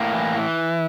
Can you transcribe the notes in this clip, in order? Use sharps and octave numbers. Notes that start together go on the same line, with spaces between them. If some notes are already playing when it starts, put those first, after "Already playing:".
Already playing: A2 A#3
E3
E3